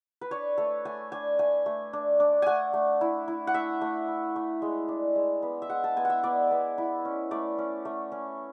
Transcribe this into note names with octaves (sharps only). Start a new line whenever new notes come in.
B4
D4 C#5
A3 A4
A3 G#5
D4 G#5
A3 G#5
A3
D4
D4
A3 F#5 G#5
A3
E4
E4
F#5
A3 E5
A3
E4
A3
G#3
D4
G#3
B3
E5
G#3 F#5
A5
B3 G#5
E5 F#5
B3 D5
B3
E4
C#4
A3 D5
C#4
A3
C#4